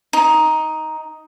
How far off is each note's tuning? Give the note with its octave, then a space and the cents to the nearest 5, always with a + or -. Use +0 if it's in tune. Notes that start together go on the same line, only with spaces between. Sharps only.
D#4 +5